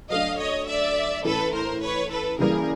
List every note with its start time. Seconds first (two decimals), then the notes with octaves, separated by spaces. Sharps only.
0.10 F#3 A3 D4 D#5 F5
0.38 C#5 D#5
0.67 D5 E5
1.25 A2 E3 A3 C#4 A4 B4
1.53 A#4 C5
1.82 B4 C#5
2.11 A4 B4
2.39 C#3 E3 G3 A#3 G#4 A#4